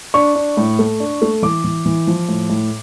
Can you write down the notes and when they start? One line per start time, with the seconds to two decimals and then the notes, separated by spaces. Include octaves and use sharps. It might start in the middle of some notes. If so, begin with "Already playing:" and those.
0.14 D4 C#6
0.35 D4
0.57 A2
0.79 A3
1.00 D4
1.22 A3
1.43 E3 D6
1.64 E3
1.86 E3
2.07 F3
2.29 A2
2.50 A2